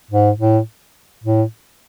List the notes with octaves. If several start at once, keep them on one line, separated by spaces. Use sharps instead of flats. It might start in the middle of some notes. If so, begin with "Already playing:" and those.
G#2
A2
A2